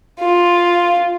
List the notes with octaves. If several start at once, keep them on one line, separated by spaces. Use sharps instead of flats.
F4